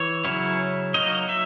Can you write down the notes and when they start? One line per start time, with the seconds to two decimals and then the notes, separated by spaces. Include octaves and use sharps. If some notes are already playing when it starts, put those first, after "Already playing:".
Already playing: E3 C#5
0.25 C#3 F#3 C#4 E4
0.94 F#3 A#3 D#4 D#5
1.29 E5